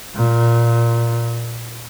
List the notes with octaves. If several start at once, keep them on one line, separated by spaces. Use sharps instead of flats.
A#2